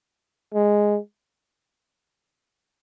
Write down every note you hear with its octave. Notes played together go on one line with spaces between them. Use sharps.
G#3